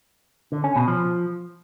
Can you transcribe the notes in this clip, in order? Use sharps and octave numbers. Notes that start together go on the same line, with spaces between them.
D3
C#4
B2
F3